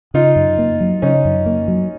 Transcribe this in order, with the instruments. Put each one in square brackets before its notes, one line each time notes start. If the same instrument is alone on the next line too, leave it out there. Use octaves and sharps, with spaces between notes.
[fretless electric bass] C#3 [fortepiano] D#4 F4
[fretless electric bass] F#2
A#3
F#3
[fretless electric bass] C#3 [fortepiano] C#4 D#4
[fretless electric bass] F#2
A#3
F#3